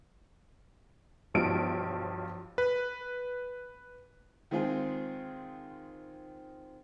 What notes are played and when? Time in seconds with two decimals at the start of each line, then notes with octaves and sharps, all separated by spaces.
1.34 B1 G2 F3 D7
2.58 B4
4.51 D#3 G#3 C4 F4 G#4